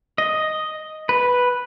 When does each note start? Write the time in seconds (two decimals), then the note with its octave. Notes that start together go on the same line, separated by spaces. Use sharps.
0.18 D#5
1.09 B4